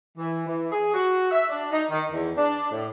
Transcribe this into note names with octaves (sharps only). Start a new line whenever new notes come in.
E3
E3
G#4
F#4
E5
D4
D#4
D#3
E2
D4
A2